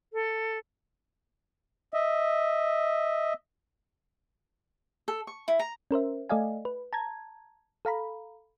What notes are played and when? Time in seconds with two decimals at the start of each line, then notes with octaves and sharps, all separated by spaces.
0.13 A4
1.94 D#5 E5
5.08 A4
5.27 C#6
5.48 E4
5.59 A#5
5.91 C#4 A#4 C5 E5
6.29 A3 A4 D5 D#5 F5 G#5
6.65 B4
6.93 A5 A#5 G#6
7.85 A4 F5 A#5 B5